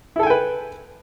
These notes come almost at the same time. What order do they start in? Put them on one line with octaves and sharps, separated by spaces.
E4 A4 G#5 G5 B4